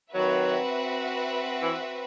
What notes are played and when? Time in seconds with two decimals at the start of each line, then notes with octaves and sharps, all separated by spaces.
0.13 D#3 F#3 C4 F#4 B4 E5
1.60 E3